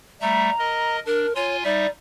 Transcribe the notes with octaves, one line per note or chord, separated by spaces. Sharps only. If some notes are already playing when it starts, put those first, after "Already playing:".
G3 A3 E5 A#5
A#4 D#5
D4 A#4
F4 C#5 G#5 C6
G3 D#4 D5 E5